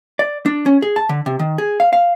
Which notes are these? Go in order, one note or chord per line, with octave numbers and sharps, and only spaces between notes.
D5
D4
C#4
G#4
A5
D3
C3
D#3
G#4
F5
F5